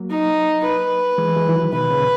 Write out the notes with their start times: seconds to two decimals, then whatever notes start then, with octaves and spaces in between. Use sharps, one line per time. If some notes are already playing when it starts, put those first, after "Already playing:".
Already playing: F#3 A#3
0.10 D#4
0.64 B4
1.18 E3 G#3
1.37 E3 G#3
1.49 E3
1.54 D#3 F#3
1.72 B2 D#3 B4
1.90 A#2 C#3